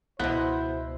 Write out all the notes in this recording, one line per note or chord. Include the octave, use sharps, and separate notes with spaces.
C#2 B2 B3 E4 C5